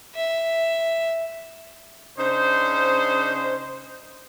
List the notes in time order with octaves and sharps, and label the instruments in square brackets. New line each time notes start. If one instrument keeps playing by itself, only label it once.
[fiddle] E5
[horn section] C#3 D4 D#4 C5